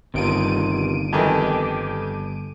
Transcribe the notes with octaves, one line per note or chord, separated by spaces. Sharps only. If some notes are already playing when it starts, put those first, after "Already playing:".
G1 C3 D#3 F4 D7 D#7
F2 D#3 E3 G4 A4